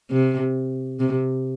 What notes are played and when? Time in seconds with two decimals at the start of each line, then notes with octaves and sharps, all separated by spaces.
0.11 C3
1.00 C3